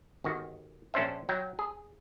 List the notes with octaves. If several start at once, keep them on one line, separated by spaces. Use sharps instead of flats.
G1 D#3 F#4
A#1 C#4 D4 C5 E5
F#3 G5 A#5
G#4